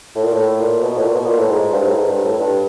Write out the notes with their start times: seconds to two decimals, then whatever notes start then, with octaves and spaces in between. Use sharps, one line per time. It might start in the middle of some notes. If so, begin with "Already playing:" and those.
0.16 A2
0.24 A#2
0.33 A2
0.61 A#2
0.83 B2
0.97 A2
1.05 A#2
1.16 B2
1.27 A#2
1.39 A2
1.49 G#2
1.73 G2
1.87 A2
1.95 G#2
2.09 G2
2.24 A2
2.39 G2